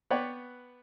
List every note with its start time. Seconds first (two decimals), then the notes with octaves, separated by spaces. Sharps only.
0.10 B3 B4 C#5 D5 F#5 G5